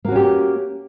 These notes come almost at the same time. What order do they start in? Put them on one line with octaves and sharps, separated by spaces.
A#3 F#4 C#4 G4